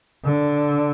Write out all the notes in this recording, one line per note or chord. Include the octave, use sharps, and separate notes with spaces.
D3